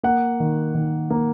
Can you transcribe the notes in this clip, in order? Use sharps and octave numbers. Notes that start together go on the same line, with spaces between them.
A#3 F#5
D#3
D#3
A#3